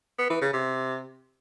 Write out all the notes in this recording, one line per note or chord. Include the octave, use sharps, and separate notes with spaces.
B3
E3
C#3
C3